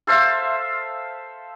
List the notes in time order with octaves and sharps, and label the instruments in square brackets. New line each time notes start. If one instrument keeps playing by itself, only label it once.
[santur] A4 C5 E5 F5